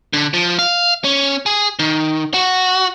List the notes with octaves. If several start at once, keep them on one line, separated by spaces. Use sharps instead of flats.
D3
F3
F5
C#4
G#4
D#3
F#4